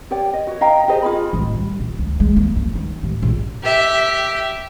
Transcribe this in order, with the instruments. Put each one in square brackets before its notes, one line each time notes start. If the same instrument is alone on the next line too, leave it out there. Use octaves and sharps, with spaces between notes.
[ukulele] G4 C#5 D5 G5
D#5
F#4 C#5
D#5 F5 G5 A#5
G4 G#4 C5 D#5
F4 F#4 G#4 B5
[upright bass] A1
G3
A#2
D2
G#3
A#3
F3
D#3
A1
A#1
[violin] G4 E5